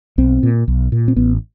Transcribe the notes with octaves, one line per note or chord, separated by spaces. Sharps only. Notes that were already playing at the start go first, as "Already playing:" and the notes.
B1 C4
A#2
B1
A#2
C4
A1 B3